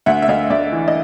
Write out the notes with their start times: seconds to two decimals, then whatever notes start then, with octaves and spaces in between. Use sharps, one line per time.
0.06 D2 E5 F#5
0.22 E5
0.28 D2 D#5 F5
0.50 D2 D5 E5
0.72 E3
0.88 D#5